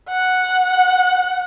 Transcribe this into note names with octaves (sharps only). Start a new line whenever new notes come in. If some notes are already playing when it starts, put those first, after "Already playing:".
F#5